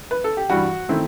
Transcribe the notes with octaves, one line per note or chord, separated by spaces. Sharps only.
B4
A4
G4
G2 E3 G3 F#4
D#3 A3 C4 E4